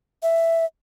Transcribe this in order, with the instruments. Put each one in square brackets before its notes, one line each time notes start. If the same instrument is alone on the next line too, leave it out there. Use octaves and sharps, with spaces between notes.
[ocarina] E5